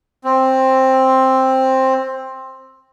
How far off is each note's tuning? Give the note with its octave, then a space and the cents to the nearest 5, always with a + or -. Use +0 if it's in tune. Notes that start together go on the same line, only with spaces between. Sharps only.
C4 +10